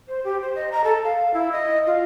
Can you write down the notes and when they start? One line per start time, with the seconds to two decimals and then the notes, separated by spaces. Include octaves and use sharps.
0.08 C5
0.24 G4
0.42 C5
0.56 D#5
0.72 A#5
0.84 A4
1.04 F5
1.34 E4
1.52 D#5
1.87 F4